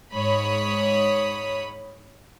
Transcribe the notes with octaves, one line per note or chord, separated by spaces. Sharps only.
G#2 C#5 B5 D#6